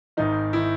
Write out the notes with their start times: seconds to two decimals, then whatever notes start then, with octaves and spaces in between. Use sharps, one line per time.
0.17 G#1 G#2 D#3 D#4
0.53 D#3 E4